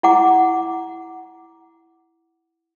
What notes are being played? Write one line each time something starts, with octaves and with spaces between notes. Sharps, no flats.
E4 F#5 D6